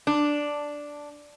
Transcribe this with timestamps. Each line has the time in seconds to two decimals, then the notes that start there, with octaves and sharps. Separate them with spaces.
0.07 D4